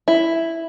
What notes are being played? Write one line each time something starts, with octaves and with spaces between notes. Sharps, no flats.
E4